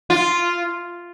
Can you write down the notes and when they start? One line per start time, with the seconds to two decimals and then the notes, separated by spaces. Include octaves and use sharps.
0.10 F4